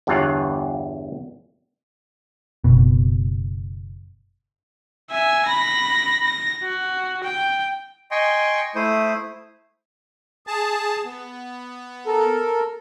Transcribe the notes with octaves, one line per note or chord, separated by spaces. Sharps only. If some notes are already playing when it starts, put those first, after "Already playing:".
G1 E2 G2 F4 C#5 F#5
F#1 B2
E5 G#5
B5 A#6
A#6
F#4
G5
D#5 G5 G#5 C6 C#6
A3 E4 C5 D#6
G#4 A5
B3
A4 A#4